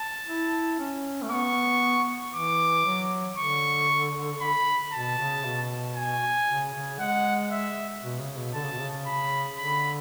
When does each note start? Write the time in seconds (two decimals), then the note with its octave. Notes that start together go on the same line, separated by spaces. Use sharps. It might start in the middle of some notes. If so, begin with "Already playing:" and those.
Already playing: A5
0.28 E4
0.79 C#4
1.22 A3
1.31 B3 C#6
2.34 E3 D6
2.85 F#3
3.38 D3 C#6
4.41 B5
4.93 B2 A5
5.19 C#3
5.45 B2
5.96 G#5
6.48 C#3
6.74 C#3
6.99 G#3 F#5
7.51 E5
8.03 B2
8.20 C#3
8.37 B2
8.54 D3 A5
8.64 C#3
8.72 B2
8.81 C#3
9.06 B5
9.58 D3 B5